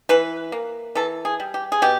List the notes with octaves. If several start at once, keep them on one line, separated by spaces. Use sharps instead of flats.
E3 B4
A#3
E3 A4
G#4
G3
G4
G#4
B2 G4